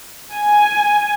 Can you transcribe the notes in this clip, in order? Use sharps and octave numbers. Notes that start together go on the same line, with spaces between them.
G#5